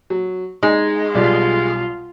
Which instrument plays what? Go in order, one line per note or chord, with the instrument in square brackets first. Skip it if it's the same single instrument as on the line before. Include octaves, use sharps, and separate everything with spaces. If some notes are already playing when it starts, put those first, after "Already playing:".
[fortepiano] F#3
[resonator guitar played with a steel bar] G#3 [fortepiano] D#4
[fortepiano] B1 G3 D5 [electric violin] F4